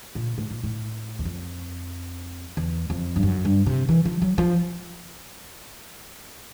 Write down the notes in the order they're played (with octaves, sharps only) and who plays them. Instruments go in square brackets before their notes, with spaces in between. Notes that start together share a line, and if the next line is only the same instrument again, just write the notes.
[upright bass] A#2
A2
A#2
A2
E2
F2
E2
F2
G2
F#2
G2
C3
E3
F3
F#3
F3